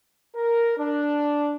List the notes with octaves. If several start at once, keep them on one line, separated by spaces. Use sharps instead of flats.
A#4
D4